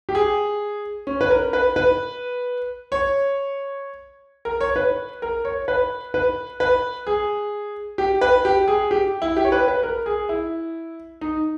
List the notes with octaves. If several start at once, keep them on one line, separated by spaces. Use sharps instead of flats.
G4
G#4
C#4
B4
A#4
B4
B4
C#5
A#4
C#5
B4
A#4
C#5
B4
B4
B4
G#4
G4
B4
G4
G#4
G4
E4
G4
C#5
B4
B4
A#4
G#4
E4
D#4